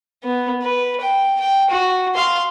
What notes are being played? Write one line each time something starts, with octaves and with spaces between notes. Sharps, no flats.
B3
B4
G5
G5
F#4
F5 C6